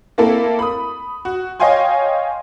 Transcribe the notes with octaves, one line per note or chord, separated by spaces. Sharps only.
A3 A#3 C4 E4 A4 A#4
B5 D#6
F#4
C#5 D#5 F5 G5 G#5 C6